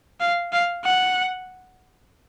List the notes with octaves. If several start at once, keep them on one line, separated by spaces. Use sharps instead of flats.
F5
F5
F#5